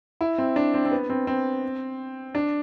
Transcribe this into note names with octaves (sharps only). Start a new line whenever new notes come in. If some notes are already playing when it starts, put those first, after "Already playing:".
E4
C4
D4
C4
C4
B3
C4
C4
D4